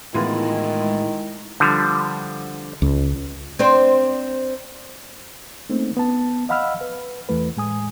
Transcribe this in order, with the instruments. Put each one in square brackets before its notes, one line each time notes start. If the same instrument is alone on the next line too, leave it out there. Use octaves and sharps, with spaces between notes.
[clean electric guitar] A2 [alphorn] D#3 [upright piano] E3 B3 F4 [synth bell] G#3 E4
[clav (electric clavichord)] D3 F3 G3
[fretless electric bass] C#2
[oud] C4 D4 C5
[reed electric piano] A3 A#3 C4 C#4 D#4
B3 A5
D#5 F5 F#5 B5 E6 F6
B4
E2 E3 A3 B4
A2 G#3 G#5 D#6